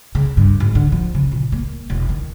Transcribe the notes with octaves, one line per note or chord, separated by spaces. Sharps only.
C#3
G2
G#1
D3
F3
C#3
A#2
A#3
E1
D#3